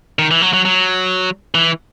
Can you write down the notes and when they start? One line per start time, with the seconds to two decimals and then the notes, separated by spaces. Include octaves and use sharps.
0.19 D#3
0.31 E3
0.42 F#3
0.53 F#3
0.65 F#3
1.55 E3